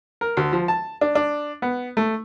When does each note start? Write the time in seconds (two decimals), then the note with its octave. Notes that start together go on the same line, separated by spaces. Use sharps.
0.21 A#4
0.37 D2
0.53 F3
0.68 A5
1.01 D4
1.15 D4
1.62 B3
1.97 A3